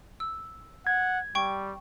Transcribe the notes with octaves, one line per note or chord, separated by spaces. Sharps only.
E6
F#5 G#6
G3 G5 C#6